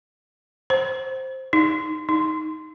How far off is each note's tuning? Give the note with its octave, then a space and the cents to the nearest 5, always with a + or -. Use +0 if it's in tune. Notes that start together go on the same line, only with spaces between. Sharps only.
C5 +5
D#4 +5
D#4 +10